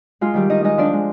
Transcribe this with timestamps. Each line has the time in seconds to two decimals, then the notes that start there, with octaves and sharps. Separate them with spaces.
0.21 G#3 F4
0.34 D#3 G3 G4
0.50 D#3 D#4 D#5
0.64 G#3 D#4 D#5
0.78 F3 D4 D5
0.93 G#3